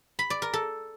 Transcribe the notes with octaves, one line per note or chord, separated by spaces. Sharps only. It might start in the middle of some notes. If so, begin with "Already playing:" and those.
B5
D5
A#4
A4